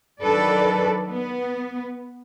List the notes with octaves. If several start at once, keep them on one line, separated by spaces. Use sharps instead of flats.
D#3 F#3 D4 A4 B4 D5
B3